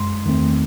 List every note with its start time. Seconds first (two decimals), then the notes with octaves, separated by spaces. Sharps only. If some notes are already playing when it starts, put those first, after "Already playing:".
Already playing: F#2 G#3 C6
0.25 E2 D#3 A3 C4